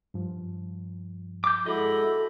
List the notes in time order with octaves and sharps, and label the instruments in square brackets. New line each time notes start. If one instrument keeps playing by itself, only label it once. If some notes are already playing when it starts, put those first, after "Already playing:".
[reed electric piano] G2 F3
[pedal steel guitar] D6 G6
[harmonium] G#3 E4 F#4 [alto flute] A4 [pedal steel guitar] D#5 B5